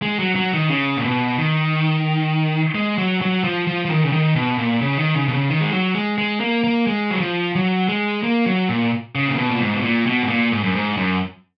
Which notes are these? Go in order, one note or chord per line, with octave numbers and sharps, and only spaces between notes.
G#3
F#3
F#3
D#3
C#3
A#2
B2
D#3
G#3
F#3
F#3
F3
F3
F3
D#3
C#3
D#3
B2
A#2
C#3
D#3
C#3
B2
C#3
D#3
G#3
F#3
G#3
G#3
A#3
A#3
G#3
F#3
F3
F#3
G#3
A#3
F#3
A#2
C#3
A#2
B2
A#2
G#2
B2
A#2
B2
G#2
A#2
G#2
F#2
G#2
F#2